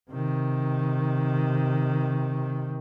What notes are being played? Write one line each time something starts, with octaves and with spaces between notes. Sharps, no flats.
C3 D#3